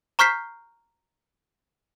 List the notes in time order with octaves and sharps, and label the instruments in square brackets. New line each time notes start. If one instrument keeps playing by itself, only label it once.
[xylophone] A#5 C#6 F6 G6 B6 C7